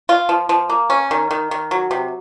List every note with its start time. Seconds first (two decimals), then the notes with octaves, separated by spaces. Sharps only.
0.09 F4
0.29 F3
0.49 F3
0.70 A#3
0.90 C#4
1.11 D#3
1.31 D#3
1.51 D#3
1.71 F#3
1.91 C3